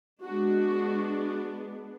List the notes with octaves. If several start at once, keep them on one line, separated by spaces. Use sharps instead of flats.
G#3 B3 D4 F#4